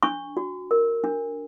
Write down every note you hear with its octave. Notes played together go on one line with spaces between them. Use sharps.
D4 C#6
F#4
A#4
D4